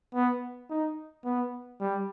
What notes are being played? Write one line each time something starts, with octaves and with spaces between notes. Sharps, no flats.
B3
D#4
B3
G3